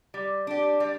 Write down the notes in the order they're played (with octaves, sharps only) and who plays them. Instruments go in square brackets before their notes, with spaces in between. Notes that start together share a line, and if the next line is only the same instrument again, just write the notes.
[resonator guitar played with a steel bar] G3
D4 G4
G3